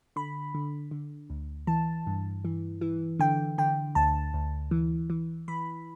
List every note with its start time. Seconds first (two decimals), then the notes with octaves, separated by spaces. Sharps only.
0.16 D3 B5
0.54 D3
0.91 D3
1.30 D2
1.67 E3 A5
2.07 G2
2.45 E3
2.81 E3
3.19 D3 G5
3.58 D3 G5
3.95 D2 A5
4.34 D2
4.71 E3
5.10 E3
5.48 E3 B5